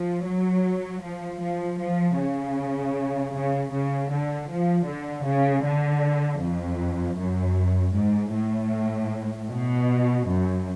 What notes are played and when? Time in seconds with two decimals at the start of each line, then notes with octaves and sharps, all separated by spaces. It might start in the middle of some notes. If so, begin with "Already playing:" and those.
Already playing: F3
0.26 F#3
1.03 F3
1.42 F3
1.80 F3
2.19 C#3
3.34 C#3
3.72 C#3
4.11 D3
4.49 F3
4.87 D3
5.26 C#3
5.64 D3
6.41 F2
7.18 F#2
7.94 G#2
8.34 A2
9.49 B2
10.26 F#2